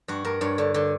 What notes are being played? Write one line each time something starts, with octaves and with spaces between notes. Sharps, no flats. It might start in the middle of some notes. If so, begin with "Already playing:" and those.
G2 F#4
G2 A#4
G2 C#5
D3
D3